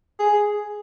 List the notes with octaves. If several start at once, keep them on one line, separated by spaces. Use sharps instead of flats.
G#4